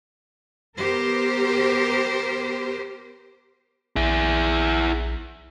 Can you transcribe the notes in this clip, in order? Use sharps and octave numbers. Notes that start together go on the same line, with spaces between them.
B3 G4 A#4 C5
A#1 E4 G#4